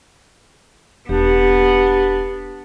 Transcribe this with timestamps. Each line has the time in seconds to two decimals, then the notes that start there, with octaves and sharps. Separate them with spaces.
1.09 E1 B3 D4 G4